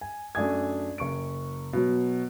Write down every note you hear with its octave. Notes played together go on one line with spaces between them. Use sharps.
G#5
F#2 A3 D4 G#5 D#6 G#6
F#1 C#6 D7
B2 F#3